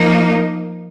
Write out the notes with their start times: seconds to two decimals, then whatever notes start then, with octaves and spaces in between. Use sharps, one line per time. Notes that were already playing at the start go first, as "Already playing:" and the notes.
Already playing: F3 A#3 D#4